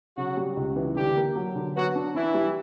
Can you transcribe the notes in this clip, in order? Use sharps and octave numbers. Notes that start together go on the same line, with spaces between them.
C#3 F#3 F#4
G3
C#2
E3
D3 G3 G4
A#3
F#3
D3
F#3 B3 F#4
D4
E3 D4 E4
G3